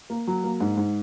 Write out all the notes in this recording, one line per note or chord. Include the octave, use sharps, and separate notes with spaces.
A#3
F#3
A#3
G#2
G#2